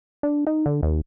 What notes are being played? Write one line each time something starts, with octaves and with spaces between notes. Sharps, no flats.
D4
D#4
D3
D#2